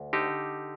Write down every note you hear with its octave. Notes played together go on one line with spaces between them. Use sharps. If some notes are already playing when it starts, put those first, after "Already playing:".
Already playing: D2
D3 D#4 G4